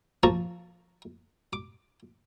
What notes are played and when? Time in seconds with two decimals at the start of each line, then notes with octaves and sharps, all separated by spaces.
0.23 F3 A#3 A5 A#5 C#6
1.53 D6